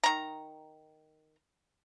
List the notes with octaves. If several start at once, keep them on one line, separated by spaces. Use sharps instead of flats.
D#3 A#5